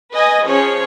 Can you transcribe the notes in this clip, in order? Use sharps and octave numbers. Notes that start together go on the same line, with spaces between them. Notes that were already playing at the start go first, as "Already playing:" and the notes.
B4 D#5 G#5 D#6
F3 C#4 G#4 C#5